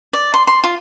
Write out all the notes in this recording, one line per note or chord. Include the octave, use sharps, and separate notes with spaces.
D5
C6
C6
F4